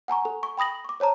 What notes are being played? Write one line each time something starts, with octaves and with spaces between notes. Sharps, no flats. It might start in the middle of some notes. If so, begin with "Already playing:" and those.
F#5 G#5 A#5 C#6
A4
C#6
G5 B5 D#6 A#6 F#7
C#6 D6
C5 C#5 A5 A#5